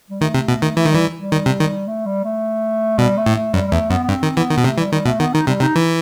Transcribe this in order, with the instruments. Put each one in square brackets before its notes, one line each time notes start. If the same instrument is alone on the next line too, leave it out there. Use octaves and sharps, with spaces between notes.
[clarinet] G3
[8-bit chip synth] D#3 [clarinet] A3
[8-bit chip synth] C3
B2
D#3
[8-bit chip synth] E3 [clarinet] A3
[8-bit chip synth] D#3
[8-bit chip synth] E3 [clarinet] G3
[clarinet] G3
[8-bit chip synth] D#3
C3
D#3
[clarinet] A3
G3
A3
[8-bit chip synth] B2 [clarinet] G3
[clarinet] A3
[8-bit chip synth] A2
[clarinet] A3
[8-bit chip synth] F#2 [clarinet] G3
[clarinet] G3
[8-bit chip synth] E2 [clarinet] A3
[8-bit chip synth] F#2 [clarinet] B3
[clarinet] B3
[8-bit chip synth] G2 [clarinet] C4
[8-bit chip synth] D#3
[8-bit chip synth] E3 [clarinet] B3
[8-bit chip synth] D#3
B2
[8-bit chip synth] C3 [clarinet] A3
[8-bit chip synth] E3 [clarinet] G3
[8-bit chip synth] D#3 [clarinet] G3
[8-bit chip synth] B2 [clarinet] A3
[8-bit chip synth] D#3 [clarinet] B3
[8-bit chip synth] D#3 [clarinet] D#4
[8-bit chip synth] C3 [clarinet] G3
[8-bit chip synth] C3 [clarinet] D#4
[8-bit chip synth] E3